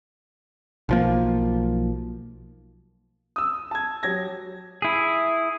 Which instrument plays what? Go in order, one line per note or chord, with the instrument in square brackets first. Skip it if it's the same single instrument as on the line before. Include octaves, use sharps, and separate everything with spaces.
[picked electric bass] B1 F3 A#3
[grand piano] D#6 E6
A5 G#6
F#3 G4 G#6 A#6
[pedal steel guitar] E4 G#4